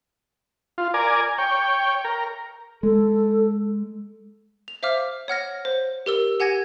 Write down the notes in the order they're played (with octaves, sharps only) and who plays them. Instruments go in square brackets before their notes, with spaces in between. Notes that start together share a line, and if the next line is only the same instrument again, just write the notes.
[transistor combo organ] F4
A#4 D5 G#5
C#5 G5
A#4
[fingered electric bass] G#3 [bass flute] A4
[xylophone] F7
C5 E5 F5 D6 F6
C#5 F#5 F6 A#6
C5
G4 A#4 E6
G4 F#5 G#5 G#6 A#6